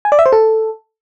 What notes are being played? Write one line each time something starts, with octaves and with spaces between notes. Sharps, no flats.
G#5
D5
E5
C5
A4